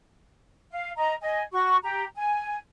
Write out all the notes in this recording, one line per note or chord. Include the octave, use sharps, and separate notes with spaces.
F5
D#5 A#5
D#5 G#5
F#4 C#6
G4 A#5
G#5